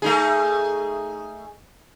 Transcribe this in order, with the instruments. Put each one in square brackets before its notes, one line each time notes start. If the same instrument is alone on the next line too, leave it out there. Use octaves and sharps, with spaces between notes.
[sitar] A3 D#4 G#4